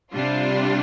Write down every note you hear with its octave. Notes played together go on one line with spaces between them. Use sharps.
C3 G3 D4 F4